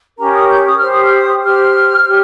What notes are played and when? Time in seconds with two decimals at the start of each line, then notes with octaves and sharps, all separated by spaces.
0.18 C#4 G4 A#4 A#5
0.33 D#6
0.49 G6
0.65 D#6
0.78 G4 C5 F6
0.91 D#6
1.04 F6
1.16 D#6
1.43 G4 C5 F6
2.06 G4 C#5